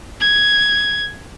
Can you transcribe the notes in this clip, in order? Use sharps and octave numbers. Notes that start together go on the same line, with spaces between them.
G#6